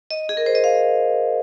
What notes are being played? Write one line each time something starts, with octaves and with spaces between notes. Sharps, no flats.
D#5
G#4
A#4
C5
D#5
F5